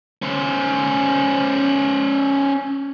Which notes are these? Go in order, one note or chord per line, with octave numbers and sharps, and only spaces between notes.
C#4 C5